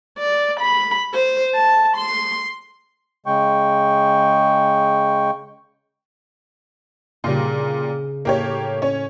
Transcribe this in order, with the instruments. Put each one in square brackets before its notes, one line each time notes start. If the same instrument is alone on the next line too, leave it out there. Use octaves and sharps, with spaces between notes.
[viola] D5
B5
C5
A5
C6
[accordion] C#3 G#3 G5 C#6
[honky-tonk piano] A#2 G3 [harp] C#3 D#4
[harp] A2 [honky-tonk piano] A#3 G4 C#5
[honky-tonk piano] C#4 C#5